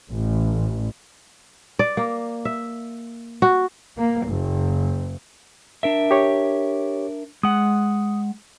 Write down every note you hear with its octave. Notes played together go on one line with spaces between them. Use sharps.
A1
D5
A#3
E5
F#4
A#3
F#1
D4 A#4 E5
G4 C#5
G#3 F#5 D#6